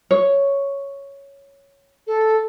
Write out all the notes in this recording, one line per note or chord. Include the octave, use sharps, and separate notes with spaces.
C#5
A4